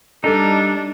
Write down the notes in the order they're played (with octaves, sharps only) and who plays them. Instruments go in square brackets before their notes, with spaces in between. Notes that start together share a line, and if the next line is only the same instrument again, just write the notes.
[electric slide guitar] G3 D#4 [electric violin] D4 [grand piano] A4